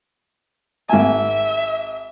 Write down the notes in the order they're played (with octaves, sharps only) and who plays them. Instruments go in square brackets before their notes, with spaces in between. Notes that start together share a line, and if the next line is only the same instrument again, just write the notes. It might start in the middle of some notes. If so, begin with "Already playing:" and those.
[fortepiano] G#1 G#5 [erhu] E5